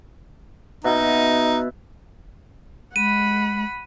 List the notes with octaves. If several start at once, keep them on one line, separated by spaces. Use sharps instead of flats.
B2 D#4 E5
G#3 F#5 B5 D#7